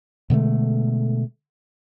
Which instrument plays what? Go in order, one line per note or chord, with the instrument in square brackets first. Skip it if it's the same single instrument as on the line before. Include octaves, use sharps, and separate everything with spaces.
[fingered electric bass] B2 D3 G#3 A3